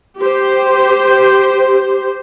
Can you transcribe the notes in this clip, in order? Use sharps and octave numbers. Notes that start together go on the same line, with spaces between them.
G4 C5